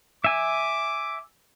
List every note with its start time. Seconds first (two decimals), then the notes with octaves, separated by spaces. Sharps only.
0.24 E5 G#5 D6